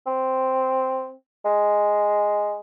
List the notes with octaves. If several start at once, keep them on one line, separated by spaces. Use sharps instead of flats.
C4
G#3